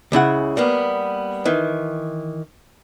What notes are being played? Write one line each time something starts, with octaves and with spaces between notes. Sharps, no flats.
C#2 C#3 E4 F#5
G3 A#3 B3
D#3 E3